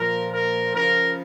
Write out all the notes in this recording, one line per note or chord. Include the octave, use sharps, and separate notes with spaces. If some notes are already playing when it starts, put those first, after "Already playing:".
Already playing: A#2 F3 A#4
A#4
C#3 F3 A#4